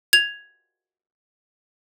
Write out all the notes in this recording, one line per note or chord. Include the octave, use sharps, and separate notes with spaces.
G#6 F7